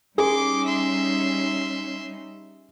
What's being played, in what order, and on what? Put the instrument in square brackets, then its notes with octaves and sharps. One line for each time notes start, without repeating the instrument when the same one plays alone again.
[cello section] G3 C#4 D#4 [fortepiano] G#4 [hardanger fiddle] C6 D6
[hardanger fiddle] E5 C6